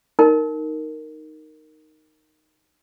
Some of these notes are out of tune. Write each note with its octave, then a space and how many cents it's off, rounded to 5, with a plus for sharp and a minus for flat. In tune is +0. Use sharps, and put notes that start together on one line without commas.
D#4 +0 A#4 -10